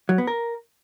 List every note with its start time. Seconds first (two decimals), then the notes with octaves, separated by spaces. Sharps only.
0.09 F#3
0.18 B3
0.27 A#4